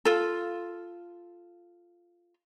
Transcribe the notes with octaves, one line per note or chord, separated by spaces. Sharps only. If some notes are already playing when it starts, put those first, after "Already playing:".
F4 A4